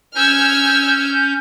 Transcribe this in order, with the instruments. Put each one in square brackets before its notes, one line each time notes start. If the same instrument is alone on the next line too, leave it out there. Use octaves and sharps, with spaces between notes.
[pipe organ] C#4 G6 [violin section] E6 F6 G#6